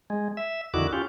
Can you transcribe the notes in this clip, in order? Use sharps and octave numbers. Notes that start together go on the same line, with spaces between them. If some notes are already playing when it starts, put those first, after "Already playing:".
G#3
E5
F2 D3 D#3 E4 F#4 D6
C#4 F4 G4